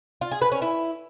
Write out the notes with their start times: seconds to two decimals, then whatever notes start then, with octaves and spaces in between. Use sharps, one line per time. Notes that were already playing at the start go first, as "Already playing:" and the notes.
0.21 F4
0.31 G#4
0.42 B4
0.52 C#4
0.62 E4